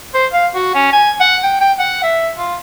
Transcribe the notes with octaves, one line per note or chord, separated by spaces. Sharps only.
C5
F5
F#4
C#4
G#5
F#5
G5
G5
F#5
E5
F4